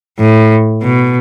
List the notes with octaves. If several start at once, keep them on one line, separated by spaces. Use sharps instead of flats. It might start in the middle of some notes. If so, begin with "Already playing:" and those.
A2
B2